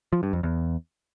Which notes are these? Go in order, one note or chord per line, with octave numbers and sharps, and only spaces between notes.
F3
G2
F2
E2